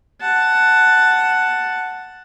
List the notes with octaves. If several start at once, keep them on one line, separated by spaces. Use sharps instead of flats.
F#5 A5